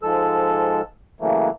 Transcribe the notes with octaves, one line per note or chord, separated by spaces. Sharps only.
G#2 F3 G#3 A4 E6
C#3 E3 F#3 A3 A#3